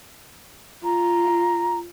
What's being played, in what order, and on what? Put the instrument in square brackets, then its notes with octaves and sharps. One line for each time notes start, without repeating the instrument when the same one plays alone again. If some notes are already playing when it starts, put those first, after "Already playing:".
[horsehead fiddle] F4 [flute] A#5